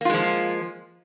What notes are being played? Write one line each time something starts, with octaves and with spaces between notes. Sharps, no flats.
F3 G#3 A#3 F4